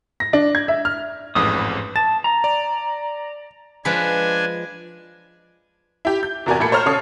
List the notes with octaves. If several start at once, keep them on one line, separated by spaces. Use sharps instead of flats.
A#6
D4
G#6
E5
F6
A1 F2 G#2 B4 D#6
A5 A6
A#5
D5
F3 G#3 D4 B4 G#5
E4 G4
G6
E2 C3 F#4 A#4 D5 G#5
A#2 A3 A4 B5 G#6 C#7
C5 C#5 A#5 F6
C#3 A4 C#5 D#6 C7